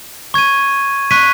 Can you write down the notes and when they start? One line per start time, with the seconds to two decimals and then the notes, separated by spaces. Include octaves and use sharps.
0.34 C#6 G#6 D#7
1.11 C#6 F#6 B6 D#7